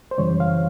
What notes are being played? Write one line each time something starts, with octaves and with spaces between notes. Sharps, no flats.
C5
F#2 C#3 E3 G3 C#5
F5